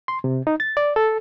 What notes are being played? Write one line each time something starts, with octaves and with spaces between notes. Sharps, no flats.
C6
C3
D#4
A6
D5
A4